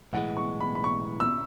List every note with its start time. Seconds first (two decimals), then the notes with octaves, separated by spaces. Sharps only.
0.13 B1 A2 E3 G#3 F#5
0.37 C#6
0.60 B5
0.75 B5
0.84 C#6
1.20 E6